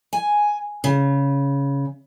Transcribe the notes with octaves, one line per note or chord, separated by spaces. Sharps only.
G#5
C#3